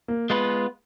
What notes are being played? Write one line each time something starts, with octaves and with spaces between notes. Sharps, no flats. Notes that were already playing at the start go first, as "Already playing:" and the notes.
A#3
G#3 B3 F4 B4